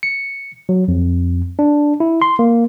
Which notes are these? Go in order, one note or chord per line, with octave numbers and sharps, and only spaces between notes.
C#7
F#3
F2
D4
E4
C6
A#3